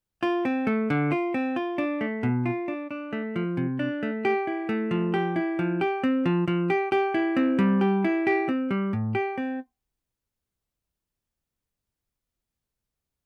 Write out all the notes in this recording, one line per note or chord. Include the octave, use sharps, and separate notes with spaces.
F4
C4
A3
D3
F4
C4
F4
D4
A3
B2
F4
D4
D4
A3
F3
C3
D4
A3
G4
E4
A3
F3
G4
E4
F3
G4
C4
F3
F3
G4
G4
E4
C4
G3
G4
E4
G4
C4
G3
A2
G4
C4